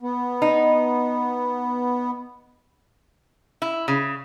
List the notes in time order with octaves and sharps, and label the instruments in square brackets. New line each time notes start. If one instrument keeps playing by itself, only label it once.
[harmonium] B3
[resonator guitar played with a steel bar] D#4
E4
C#3